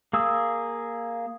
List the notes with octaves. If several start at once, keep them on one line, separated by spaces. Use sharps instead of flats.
A#3 G#4 E6